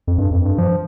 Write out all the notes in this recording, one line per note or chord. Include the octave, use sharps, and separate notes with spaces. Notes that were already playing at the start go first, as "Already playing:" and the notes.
F2
G2
F2
G2
F3